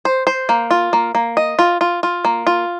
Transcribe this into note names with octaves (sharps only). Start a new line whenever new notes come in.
C5
C5
A#3
F4
A#3
A#3
D#5
F4
F4
F4
A#3
F4